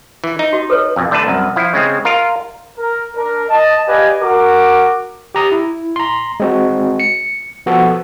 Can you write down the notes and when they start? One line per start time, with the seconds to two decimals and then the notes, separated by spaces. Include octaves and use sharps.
0.24 E3
0.39 D#4
0.53 F#4 D#5
0.70 A4 B4 C#5
0.96 F2 B2
1.11 D3 A3 D4 B4 A5
1.27 C2 F#2
1.56 F3 E4
1.74 C#3 G#3 C4
2.05 F4 A#4
2.78 A#4
3.17 D4 A#4
3.50 D#5 A5
3.88 G4 B4 D5 D#5 F5 G#5
4.21 F#4 A#4 D6
5.35 G4 A#5 D#6
5.52 E4
5.96 A#5 C6
6.40 G#3 C4 F#4
7.00 C#7
7.66 F3 B3 F#4 A4